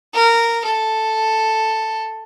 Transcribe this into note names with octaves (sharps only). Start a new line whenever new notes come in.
A#4
A4